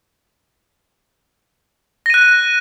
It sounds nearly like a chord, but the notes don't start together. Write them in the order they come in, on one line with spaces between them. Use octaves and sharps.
A#6 D#7 F#6